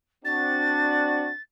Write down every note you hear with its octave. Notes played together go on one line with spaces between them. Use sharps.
C4 D4 F#4 A6